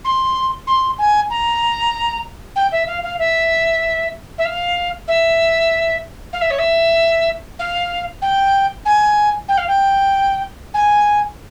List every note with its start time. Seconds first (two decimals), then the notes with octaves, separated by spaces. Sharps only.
0.05 C6
0.67 C6
0.98 G#5
1.30 A#5
2.56 G5
2.72 E5
2.87 F5
3.03 F5
3.19 E5
4.38 E5
4.45 F5
5.08 E5
6.33 F5
6.41 E5
6.51 C#5
6.59 E5
7.59 F5
8.22 G5
8.85 G#5
9.48 G5
9.58 F5
9.68 G5
10.74 G#5